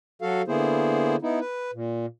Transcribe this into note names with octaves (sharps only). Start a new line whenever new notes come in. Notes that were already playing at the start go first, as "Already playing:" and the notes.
F#3 F#4 A4 F5
D3 A#3 B3 E4 G#4 C5
B3 D#4 E4
B4
A#2